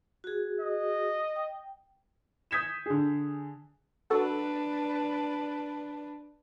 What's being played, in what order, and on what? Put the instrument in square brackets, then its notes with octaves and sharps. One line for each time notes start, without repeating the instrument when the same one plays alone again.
[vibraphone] F#4 G#4
[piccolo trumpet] D#5
[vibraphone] G5
[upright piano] D#6 G6 G#6 B6 C#7 E7
D3 G#4
[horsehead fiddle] D4 B4 [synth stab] F#4 A4